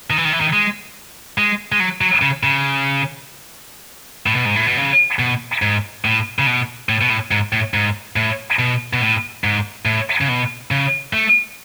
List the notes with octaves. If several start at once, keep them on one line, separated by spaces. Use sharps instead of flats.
D#3
E3
D#3
E3
D#3
G#3
G#3
G#3
F#3
F#3
C#3
C#3
A2
B2
G#2
A2
B2
C#3
B2
G#2
A2
C#3
B2
A2
B2
A2
G#2
A2
G#2
A2
B2
B2
A2
G#2
A2
C#3
B2
C#3
A3